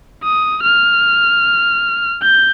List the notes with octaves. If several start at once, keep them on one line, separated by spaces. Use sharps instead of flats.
D#6
F6
G6